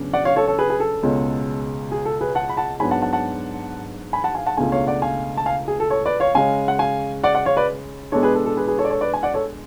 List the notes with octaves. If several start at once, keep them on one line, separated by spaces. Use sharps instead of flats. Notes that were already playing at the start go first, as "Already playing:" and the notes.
Already playing: C#3 F#3 B3 D4
D5 F#5
C#5 F5
A4 C#5
A4 C#5
G#4 B4
G#4
A4
C#2 B2 G#3 C#4
G#4
A4
G#4 B4
F#5 A5
B5
F#5 A5
G#2 F#3 B3 D4 G#5 B5
F#5 A5
F#5 A5
F#5 A5
G#5 B5
F#5 A5
F5 G#5
F#5 A5
C#2 B2 A3 D4 F5 G#5
C#5 F5
D5 F#5
F5 G#5
A5
F5 G#5
G#4
A4
A4 C#5
B4 D5
C#5 F5
C#3 G#3 C#4 F5 G#5
F#5
F5 G#5
D5 F#5
D5 F#5
C#5 F5
B4 D5
B2 G#3 B3 D4 A4 C#5
G#4 B4
A4
A4
G#4 B4
G#4 B4
A4 C#5
D5
A4 C#5
B4 D5
G#5
D5 F#5
A4 C#5